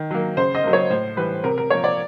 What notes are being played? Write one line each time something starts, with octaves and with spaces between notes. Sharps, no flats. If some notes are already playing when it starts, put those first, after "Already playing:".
Already playing: D#3
F#3 A#3
C#3 C5
D#5
F#3 A#3
C#5
A2 C5
E3 G3 B4
C3 A#4
A#4
F3 A#3 C#5
D5